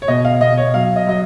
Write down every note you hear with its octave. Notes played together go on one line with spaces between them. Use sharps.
C#5
B2 D#5
F5
B2 D#5
C#5
F#3 F5
D#5
F#3 D#5